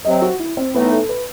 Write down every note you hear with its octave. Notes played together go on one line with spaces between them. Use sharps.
C3 F#3 C4 D#5
F#4
E4
C4
A2 E3 A3 B3 D#4
A4
B4